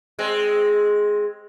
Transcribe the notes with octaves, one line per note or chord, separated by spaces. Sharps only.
G#3 C4